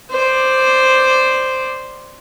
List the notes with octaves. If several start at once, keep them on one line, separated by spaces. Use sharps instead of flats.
C5 D5